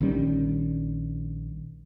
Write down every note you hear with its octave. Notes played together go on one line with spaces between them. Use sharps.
A#1 D#3 G3 C#4